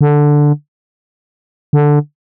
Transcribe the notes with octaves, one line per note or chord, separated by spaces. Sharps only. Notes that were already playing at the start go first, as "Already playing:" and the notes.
D3
D3